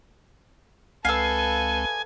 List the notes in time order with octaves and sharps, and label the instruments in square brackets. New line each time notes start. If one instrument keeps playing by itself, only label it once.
[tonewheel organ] C#2 G#3 C4 [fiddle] A4 B4 [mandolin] F5 E6 [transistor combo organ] G#5